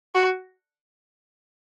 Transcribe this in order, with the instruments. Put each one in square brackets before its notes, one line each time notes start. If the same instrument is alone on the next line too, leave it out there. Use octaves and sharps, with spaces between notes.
[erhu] F#4